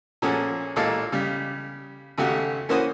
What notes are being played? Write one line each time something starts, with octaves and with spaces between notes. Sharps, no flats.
A#2 F3 C#4 F#4 G#4 A4
A1 A#2 G#3 A4 F5 A5
C#3 G3
G#1 C#3 A3 F#4 G4
E3 A#3 C#4 F#4 C5 D#6